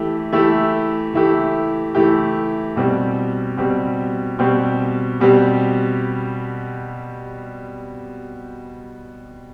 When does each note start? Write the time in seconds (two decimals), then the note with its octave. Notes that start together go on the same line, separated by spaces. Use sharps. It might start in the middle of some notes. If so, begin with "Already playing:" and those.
Already playing: E3 A3 E4 G4
0.33 E3 A3 E4 G4
1.14 E3 A3 E4 G4
1.95 E3 A3 E4 G4
2.76 B2 G3 C4 G4
3.57 B2 G3 C4 G4
4.39 B2 G3 C4 G4
5.20 B2 G3 C4 G4